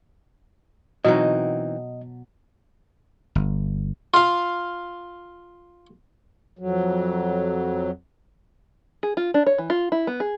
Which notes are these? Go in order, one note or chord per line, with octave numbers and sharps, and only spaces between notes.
B2 E3 F#3 C4 D#4 D#5
G1
F4 F5
F2 F#3
G#4
F4
D4
C#5
E3
F4
E4
B3
G#4